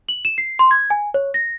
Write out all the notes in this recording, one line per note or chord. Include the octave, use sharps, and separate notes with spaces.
F#7
E7
C7
C6
G#6
G#5
C#5
A#6